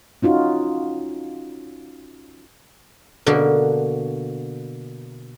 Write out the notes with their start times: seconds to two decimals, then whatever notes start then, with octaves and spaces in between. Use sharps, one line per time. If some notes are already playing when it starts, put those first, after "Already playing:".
0.22 C#4 D#4 F4 F#4
3.26 B2 D3 A#3